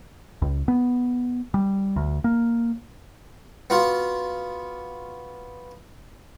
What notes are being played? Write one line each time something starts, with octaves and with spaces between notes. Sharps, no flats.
C#2
B3
G3
D2
A#3
B3 F4 F#4